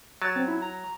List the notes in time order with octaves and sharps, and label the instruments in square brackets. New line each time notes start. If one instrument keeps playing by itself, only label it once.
[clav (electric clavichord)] F#3 [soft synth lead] A6
[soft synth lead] C4
E4
A#5